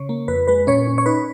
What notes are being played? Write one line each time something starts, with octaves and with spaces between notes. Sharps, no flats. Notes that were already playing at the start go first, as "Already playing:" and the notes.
Already playing: C#3 C#5
A#3
F2 B4
G#3 B4
A#2 C#4 C#5
C#4
C#5
D#4 B4